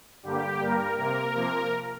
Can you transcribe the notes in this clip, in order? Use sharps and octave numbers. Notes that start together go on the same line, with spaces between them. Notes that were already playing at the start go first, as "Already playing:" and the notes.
G2 D3 G3 A#3 G4
G2 G3 A#3 A#4
C3 A#3 A#4
C3 F3 A#3